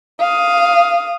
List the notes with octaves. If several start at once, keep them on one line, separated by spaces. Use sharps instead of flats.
F5 D#6